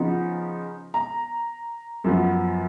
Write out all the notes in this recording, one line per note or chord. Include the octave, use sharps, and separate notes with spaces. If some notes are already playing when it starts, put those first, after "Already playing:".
Already playing: C#3 F3 B3 D#4
A#5
F#2 F3 B3